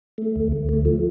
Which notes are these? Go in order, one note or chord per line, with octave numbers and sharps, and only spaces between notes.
A3
D2
D2
A3
F3